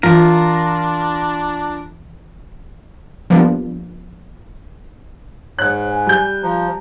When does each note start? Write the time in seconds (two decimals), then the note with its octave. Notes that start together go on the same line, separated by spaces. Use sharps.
0.03 E3 D4 F4 A#4
3.30 F3 G3 A#3 B3 D4
5.59 G#2 C#5 F#6
5.91 G#5
6.06 G3 G6
6.43 F3 A#5